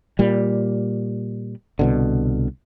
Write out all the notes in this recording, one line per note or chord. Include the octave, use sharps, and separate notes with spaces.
A#2 G3
C2 B2 D3